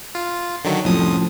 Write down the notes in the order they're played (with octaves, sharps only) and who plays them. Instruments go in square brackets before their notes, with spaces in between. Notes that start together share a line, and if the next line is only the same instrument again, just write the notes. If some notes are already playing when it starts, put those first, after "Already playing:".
[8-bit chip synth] F4
D3 D#3 F#3
[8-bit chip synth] C2 F2 D#6 [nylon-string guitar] A2 F3 C#4